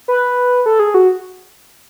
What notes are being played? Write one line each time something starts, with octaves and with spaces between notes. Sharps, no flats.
B4
A4
G#4
F#4